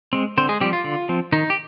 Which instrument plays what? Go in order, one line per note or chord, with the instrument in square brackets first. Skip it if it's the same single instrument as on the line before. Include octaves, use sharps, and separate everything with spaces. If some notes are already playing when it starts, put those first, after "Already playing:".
[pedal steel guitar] G#3 C4
D3 C4 C5
G#3 G#4
F3 G3 C4 G4
F4
D3
F3 C4
D#3 D#4
G4